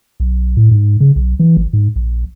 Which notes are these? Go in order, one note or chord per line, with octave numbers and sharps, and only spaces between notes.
B1
A2
G#2
C#3
B1
E3
G#1
G#2
A#1